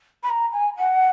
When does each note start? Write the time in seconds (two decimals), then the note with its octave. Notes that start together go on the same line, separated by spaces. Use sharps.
0.23 B5
0.29 A#5
0.52 G#5
0.76 F#5